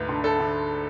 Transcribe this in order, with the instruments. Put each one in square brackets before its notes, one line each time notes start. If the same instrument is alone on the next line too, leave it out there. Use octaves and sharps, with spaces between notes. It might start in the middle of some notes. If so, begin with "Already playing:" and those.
Already playing: [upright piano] D2 G#2 B4
D3
A4
D3